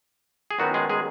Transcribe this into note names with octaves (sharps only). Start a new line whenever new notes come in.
G#4
F#2 D#3 F#3 B3 D#4 F#4
G#3 G#4
G#3 G#4